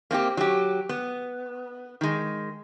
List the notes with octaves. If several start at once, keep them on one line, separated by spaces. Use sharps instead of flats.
A#3 C4 F4 G4
F#3 G4
B3
D#3 G#3